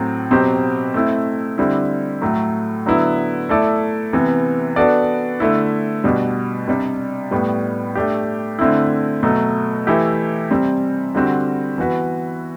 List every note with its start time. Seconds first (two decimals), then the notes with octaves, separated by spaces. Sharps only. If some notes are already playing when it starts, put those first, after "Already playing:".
Already playing: A2 F#3 C4
0.31 B2 F#3 C4 G4 C5
0.94 A3 C4 E4
1.58 D3 G3 C4 E4
2.21 A2 F#3 A3
2.86 D3 F#3 B3 E4
3.49 A3 E4 A4 D5
4.13 C3 E3 B3
4.76 B3 D4 F#4 A4 D5
5.40 D3 A3 E4
6.04 B2 G3 D4 F#4
6.68 C3 G3 D4
7.31 A2 G3 B3
7.95 A3 D4 G4
8.59 D3 A3 C4 E4
9.23 B2 F#3 A3
9.87 E3 A3 E4 G4
10.51 C3 G3 C4
11.15 D3 G3 C4 F#4
11.78 E3 B3 F#4 B4